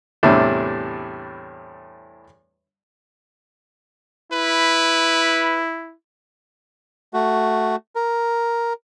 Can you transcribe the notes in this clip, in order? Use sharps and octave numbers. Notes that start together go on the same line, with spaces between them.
E2 A2 C3 G3 D4 E4
E4 B4
A3 F#4
A#4